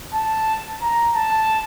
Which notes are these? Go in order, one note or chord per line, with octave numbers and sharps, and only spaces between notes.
A5
A#5
A5